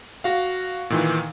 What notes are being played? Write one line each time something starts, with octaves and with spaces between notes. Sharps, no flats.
F#4 F5
A#2 D#3 E3